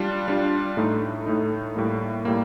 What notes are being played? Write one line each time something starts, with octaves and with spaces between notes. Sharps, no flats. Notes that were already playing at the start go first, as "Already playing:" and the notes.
Already playing: G3 D4 F4
G3 D4 F4
A2 A3 D#4
A2 A3 D#4
A2 G3 A#3
A2 G3 A#3